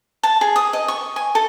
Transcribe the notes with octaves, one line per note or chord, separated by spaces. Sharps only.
A5
G#4
D#6
D#5
C#6
G#5
A4